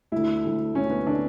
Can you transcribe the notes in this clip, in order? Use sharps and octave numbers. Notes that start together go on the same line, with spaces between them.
D2 D3 E4
D2 D3
D2 D3 C#4
B3
D3 D4